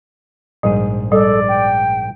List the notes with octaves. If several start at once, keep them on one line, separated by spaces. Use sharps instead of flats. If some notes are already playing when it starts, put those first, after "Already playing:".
A#1 G#2 G3 G#4
G3 A4 D5
G5